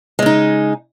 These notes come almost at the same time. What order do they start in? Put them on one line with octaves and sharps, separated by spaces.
G#3 C#3 D#4